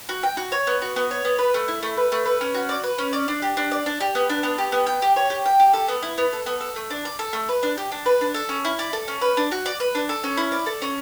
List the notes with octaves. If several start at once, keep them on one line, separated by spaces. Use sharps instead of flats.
F#4
G5
F#4
C#5
B3
F#4
B3
C#5
B3
B4
A3
E4
A3
B4
A3
B4
C#4
F#4
D5
B4
C#4
D5
D4
G4
D4
D5
D4
G4
B3
D4
B3
G4
B3
G5
G4
C#5
G4
G5
G4
A4
B3
E4
B3
A4
B3
A4
A3
D4
D5
A4
A3
B4
D4
G4
D4
B4
D4
A4
C#4
E4
D5
A4
C#4
B4
D4
F#4
D5
B4
D4
A4
C#4
E4
D5
A4
C#4